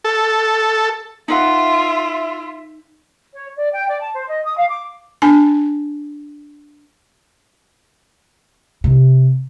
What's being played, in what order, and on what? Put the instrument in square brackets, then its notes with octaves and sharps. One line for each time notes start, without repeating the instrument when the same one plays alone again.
[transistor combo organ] A4
[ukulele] D#4 B4 F#5 [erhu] F4 [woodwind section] E5
[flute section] C#5
D5
G5
D5
A5
C5
D#5
D#6
F5
D6
[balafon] D4 G#5 A5
[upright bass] C3